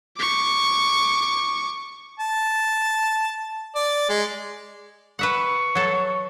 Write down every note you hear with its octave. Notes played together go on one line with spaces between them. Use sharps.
C#6 D6
A5
D5
G#3
B4 E5 F#5 C#6
F#3 A4